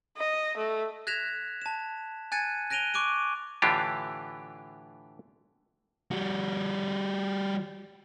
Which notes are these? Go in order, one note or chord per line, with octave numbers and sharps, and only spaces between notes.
D#5
A3
F#6 G#6 A#6 B6 E7 F7
A5 E7
G#5 F#6 G#6 A6 C#7 D#7
F#6 A#6 D7 D#7 F7 G7
C#6 D6 F#6 D7 D#7
A2 D3 E3 D4 F4 G4
G3 F#4